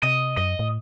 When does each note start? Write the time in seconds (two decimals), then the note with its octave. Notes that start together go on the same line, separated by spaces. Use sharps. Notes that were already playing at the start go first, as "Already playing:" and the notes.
0.03 C3 D#5
0.37 F#2 D#5
0.59 A2